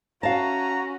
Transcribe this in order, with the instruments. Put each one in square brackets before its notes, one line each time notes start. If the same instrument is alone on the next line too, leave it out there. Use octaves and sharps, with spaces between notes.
[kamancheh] C#4 F#4 [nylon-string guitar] F5 A5 [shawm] A#5